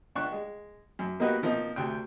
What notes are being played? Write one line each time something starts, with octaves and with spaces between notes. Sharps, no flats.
C#2 D4 C#6 F#6
G#3
F#2
A#3 B3 D#4 F#4 G4 B4
B2 F3 A#3 C4 D#4
D2 C3 G5